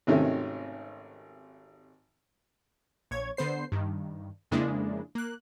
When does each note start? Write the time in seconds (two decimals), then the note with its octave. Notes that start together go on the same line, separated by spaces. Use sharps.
0.07 G#1 C3 D#3 A3 C#4
3.11 A#1 C#5 G#6
3.37 D3 B3 C5 C7
3.72 G2 D#3
4.51 F2 C#3 G#3 A#3 D4 E4
5.15 A#3 F#6